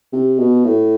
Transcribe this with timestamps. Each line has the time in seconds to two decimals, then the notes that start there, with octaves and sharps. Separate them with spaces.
0.13 C3
0.39 B2
0.65 A2